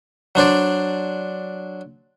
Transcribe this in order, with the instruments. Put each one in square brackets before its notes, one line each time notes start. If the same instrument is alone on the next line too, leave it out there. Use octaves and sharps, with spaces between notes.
[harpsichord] F#3 D4 C5 D5